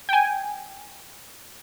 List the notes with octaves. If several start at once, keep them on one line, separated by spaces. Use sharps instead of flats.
G5 G#5